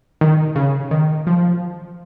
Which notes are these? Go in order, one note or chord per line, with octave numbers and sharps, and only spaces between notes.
D#3
C#3
D#3
F3